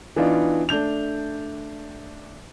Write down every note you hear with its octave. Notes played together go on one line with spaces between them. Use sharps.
E3 B3 D4 D#4 F4
A3 D4 G6 F7